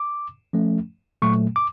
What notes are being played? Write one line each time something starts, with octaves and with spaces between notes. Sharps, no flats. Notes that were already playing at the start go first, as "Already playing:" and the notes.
Already playing: D6
F3 A3 C#4
A#2 F#3 A3 C#6
D6